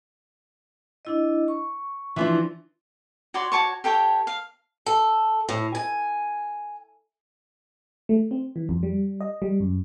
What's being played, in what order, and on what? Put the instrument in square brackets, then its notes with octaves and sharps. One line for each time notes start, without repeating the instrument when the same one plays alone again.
[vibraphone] D4 E4 D#5
C#6
[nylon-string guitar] E3 F3 D4
[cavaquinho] F#4 C#5 D5 C6
F#4 C#5 A5 C#6
G4 A4 C#5 G5
F5
[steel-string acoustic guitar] A4
A2
G#5
[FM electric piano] A3
C4
E3
F2
G3
D#5
G3
F#2